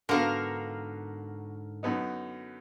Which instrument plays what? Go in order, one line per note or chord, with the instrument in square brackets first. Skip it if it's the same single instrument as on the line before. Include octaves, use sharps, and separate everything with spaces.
[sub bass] G#2 [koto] D3 [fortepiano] B3 F#4 [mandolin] A#4 F5
[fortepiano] F#2 B3 D#4